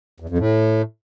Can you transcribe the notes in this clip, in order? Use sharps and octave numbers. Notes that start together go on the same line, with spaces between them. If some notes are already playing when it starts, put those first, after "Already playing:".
E2
F2
A2